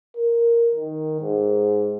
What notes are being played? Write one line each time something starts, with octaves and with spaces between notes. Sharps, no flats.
A#4
D#3
G#2